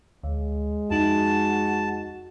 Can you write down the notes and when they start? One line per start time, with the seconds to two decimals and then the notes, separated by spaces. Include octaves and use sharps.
0.24 D2 G#3
0.91 F2 D#4 F#4 A5